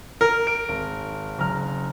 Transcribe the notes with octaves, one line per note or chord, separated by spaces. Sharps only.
A#4
D7
G#1
F#1 A#5 F6